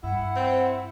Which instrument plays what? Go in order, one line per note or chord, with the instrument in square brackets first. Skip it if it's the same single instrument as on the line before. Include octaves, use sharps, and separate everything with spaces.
[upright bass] G2 [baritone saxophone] E4 [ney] F#5
[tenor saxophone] C4